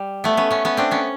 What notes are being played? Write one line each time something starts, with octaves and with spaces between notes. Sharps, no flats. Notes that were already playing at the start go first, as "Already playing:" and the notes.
Already playing: G3
A3 B3
B3 C#4
B3 C#4
B3 C#4
C4 D4
B3 C#4